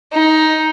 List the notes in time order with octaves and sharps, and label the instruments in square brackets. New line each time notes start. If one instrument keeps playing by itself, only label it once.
[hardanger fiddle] D#4